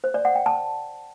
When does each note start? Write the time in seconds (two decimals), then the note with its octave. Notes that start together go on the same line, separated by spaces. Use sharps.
0.04 C5
0.14 D5
0.25 F#5
0.35 G5
0.46 A5